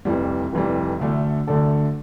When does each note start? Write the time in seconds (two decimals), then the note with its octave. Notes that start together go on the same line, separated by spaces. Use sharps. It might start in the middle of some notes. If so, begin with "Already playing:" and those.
0.05 F1 F2 E3 G3
0.53 F1 F2 E3 G3
1.00 D2 D3 A3 D4 A4
1.47 D2 D3 A3 D4 A4